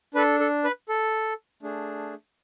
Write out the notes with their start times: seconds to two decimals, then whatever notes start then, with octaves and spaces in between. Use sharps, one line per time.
0.15 D4 A4 B4
0.40 A4
0.64 B4
0.89 A4
1.63 A3 D4 G#4